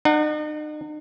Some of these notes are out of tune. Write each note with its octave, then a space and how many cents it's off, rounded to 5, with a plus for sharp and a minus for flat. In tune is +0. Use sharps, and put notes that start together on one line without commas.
D#4 -45 F#5 +0